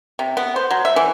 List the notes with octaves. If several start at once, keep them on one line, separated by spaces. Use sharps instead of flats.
C3
B3
C5
F#3
E5
E3